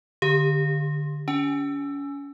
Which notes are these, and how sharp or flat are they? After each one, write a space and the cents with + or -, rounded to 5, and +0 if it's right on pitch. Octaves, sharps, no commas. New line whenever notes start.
D3 +15 G4 +0
C#4 +35 G#5 +0